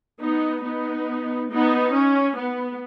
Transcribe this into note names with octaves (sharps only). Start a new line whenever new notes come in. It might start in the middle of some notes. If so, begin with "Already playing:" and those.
B3 D#4
B3 D#4
B3 D#4
C#4
B3